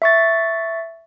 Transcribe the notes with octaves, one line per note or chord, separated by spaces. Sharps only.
E5 C#6 A6